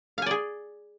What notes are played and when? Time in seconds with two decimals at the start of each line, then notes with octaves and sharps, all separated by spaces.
0.18 F5
0.22 G#5
0.26 D5
0.31 G#4